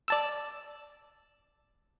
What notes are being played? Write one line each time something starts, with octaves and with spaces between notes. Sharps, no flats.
D5 A5 E6